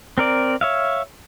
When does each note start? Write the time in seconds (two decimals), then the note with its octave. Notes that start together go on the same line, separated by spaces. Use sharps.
0.18 C4 A#4 D5
0.61 C#5 E5 F5